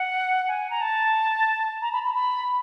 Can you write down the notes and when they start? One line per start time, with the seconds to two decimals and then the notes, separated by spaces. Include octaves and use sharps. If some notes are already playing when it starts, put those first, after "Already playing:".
Already playing: F#5
0.48 G#5
0.70 A#5
0.81 A5
1.82 A#5
1.93 B5
2.03 B5
2.14 B5